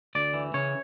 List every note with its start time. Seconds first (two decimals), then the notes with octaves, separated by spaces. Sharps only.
0.15 D2 D5
0.34 E3
0.54 C#3 C#5